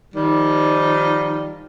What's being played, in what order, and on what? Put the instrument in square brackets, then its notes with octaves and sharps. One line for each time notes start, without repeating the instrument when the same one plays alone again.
[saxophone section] D#3 F3 G3